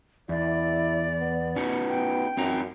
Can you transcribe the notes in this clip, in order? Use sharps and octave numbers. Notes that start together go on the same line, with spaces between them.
E2 E4 D5
B3
C#4 D#4 F#4
G5
F#2 C4 D#4 A#5